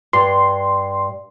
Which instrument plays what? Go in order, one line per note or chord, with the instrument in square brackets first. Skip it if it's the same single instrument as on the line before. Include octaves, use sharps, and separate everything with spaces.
[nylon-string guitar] G2 [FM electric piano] C6